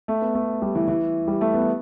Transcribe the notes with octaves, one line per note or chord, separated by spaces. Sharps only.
A3
B3
A3
G3
E3
E3
G3
A3
B3